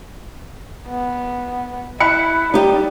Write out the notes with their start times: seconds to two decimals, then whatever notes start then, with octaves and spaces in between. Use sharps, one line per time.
0.88 B3
2.00 E4 B5 F#6 C#7
2.54 G3 D#4 G4